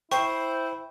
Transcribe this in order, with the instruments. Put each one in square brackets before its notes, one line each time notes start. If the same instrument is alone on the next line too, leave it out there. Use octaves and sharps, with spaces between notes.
[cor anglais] E4 [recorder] C5 [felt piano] G5 [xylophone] C#6